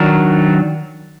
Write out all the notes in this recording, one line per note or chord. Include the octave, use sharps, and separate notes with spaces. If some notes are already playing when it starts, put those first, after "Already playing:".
Already playing: D#3 F#3 D4 F#4 A#4